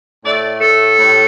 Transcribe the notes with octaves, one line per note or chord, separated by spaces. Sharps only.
A2 A3 D5
A4
A2 G3